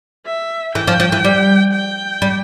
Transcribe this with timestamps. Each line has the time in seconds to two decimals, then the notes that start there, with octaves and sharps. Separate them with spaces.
0.26 E5
0.75 E3 G5
0.87 F3
1.00 F3
1.12 E3
1.24 G3
1.73 G5
2.22 G3